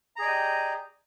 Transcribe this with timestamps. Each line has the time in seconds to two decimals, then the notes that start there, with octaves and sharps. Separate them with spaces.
0.16 A#5
0.19 G#4
0.22 D5
0.25 D#5
0.27 G4